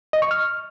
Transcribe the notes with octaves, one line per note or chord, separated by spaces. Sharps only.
D#5
C#6
F6